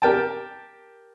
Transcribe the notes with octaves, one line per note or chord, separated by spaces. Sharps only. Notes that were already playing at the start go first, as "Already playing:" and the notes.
G4 A#4 G5 A5